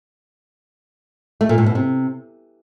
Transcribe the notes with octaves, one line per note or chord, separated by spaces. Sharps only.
A3
A#2
A2
B2
C3